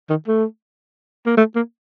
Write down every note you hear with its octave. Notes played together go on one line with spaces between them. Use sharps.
D#3
A3
A#3
A3
A#3